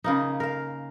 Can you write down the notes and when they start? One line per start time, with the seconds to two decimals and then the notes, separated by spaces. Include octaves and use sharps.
0.04 C#3 A#3 D#4
0.40 A#4 F5